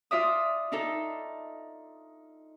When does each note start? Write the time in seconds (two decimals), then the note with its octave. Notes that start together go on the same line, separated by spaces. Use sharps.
0.11 F4 D5 E5 D#6
0.72 D4 D#4 A4